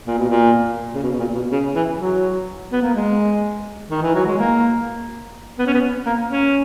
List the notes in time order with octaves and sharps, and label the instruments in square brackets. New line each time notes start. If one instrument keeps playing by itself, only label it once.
[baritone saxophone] A#2
B2
A#2
C#3
B2
B2
A#2
B2
C#3
E3
F#3
B3
A#3
G#3
D#3
E3
F#3
G#3
A#3
B3
C#4
B3
A#3
C#4